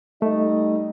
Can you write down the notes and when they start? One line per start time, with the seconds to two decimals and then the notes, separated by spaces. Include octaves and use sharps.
0.22 G3 A3 D#4 D#5